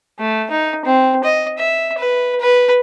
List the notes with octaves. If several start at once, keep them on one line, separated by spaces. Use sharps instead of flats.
A3
D#4
C4
D#5
E5
B4
B4